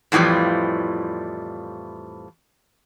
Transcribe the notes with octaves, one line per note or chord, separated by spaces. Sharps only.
F2 A2 E3 F3 G3